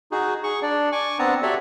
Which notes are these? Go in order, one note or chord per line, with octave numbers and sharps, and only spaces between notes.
D#4 F#4 G#4
G#4 C#6
D4 D5
G#5 C#6 D6
B3 C4 D4 A5 A#5
F#4 G4 A4 C#5 D5 E5